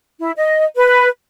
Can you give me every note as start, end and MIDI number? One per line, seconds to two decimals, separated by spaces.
0.19 0.31 64
0.37 0.64 75
0.76 1.08 71